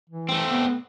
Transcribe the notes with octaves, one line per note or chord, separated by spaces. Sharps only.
E3
A3 C4
B3